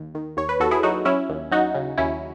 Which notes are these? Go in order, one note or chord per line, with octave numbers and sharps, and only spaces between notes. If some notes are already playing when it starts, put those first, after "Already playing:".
Already playing: D#2
D#3
D#2 C#5
B4
D#2 F#4 A4
E4 G#4
F#3 D#4 F#4
F#3 C#4 E4
D#2
F#3 D#4 F#4
C#3
D#2 C#4 E4